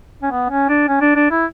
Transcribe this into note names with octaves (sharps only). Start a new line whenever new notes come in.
C#4
B3
C#4
D4
C#4
D4
D4
E4